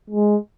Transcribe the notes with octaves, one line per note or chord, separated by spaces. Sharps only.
G#3